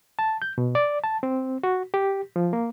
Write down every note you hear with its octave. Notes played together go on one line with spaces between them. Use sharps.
A5
G6
B2
D5
A5
C4
F#4
G4
F3
A#3